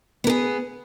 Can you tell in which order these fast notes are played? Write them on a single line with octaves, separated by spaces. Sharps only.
B3 A#4 G#4